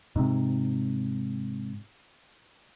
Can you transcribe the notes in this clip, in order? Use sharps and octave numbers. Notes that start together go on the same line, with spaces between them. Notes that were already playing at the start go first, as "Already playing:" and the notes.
G#2 C3